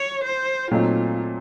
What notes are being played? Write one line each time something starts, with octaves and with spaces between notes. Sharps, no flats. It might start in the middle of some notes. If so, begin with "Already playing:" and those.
Already playing: C#5
C5
A#2 F#3 A3 C4 D#4 F4